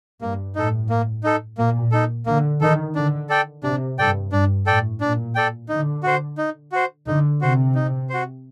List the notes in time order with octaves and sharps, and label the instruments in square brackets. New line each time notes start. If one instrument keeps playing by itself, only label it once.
[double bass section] G2 [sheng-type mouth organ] A#3
[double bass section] A2 [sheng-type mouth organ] D#4 A4
[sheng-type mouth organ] A#3
D#4 A4
[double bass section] A#2 [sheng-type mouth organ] A#3
[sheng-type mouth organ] D#4 A4
[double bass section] D3 [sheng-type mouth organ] A#3
[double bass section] D#3 [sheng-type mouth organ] D#4 A4
[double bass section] D3 [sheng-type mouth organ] D4
[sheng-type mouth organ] A4 D5 G5
[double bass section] C3 [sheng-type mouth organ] D4
[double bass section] G2 [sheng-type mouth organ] A4 D5 G5
[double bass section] G2 [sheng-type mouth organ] D4
[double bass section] A2 [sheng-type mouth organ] A4 D5 G5
[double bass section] A#2 [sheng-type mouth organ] D4
[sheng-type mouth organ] A4 D5 G5
[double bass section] D3 [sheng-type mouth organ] D#4
[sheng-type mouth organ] F#4 C5
D#4
F#4 C5
[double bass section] D3 [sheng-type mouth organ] D#4
[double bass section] C3 [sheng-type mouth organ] F#4 C5
[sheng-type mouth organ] D#4
F#4 C5